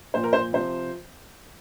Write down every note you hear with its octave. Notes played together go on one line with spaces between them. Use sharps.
A#2 F3 C5
A#4
C5
C3 F3 C5